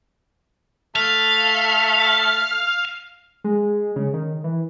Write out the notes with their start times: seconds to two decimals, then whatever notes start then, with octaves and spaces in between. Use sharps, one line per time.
0.96 A3 F5
3.44 G#3
3.96 C#3
4.14 D#3
4.44 E3